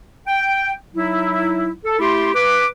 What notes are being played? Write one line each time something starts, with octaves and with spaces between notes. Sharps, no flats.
G5
F#3 D#4 E4
A4
A3 E4 G4 C6
B4 D6